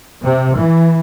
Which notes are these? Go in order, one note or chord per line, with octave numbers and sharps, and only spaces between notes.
C3
E3